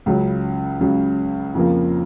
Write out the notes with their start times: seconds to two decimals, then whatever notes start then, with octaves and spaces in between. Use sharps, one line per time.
0.06 C#2 C#3 F#3
0.81 C#2 C#3 F#3
1.54 F2 C#3 F3 A#3